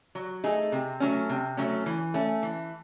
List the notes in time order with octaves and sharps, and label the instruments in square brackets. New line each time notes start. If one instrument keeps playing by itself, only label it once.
[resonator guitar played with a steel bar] F#3
A3 D#4 G#4
C3
F#3 A3 C#4
C3
F#3 A3 C#4
E3
A3 C#4
E3